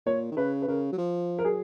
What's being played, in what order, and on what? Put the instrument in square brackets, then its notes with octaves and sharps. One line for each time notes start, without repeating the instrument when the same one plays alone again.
[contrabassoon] A#2 [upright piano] C#5
[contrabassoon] D#3
[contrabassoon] C#3 [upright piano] B4
[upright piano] B4
[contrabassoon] C#3 [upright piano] A#4
[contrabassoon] F#3
F3
[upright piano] A#4
[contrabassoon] F#3 [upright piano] G#4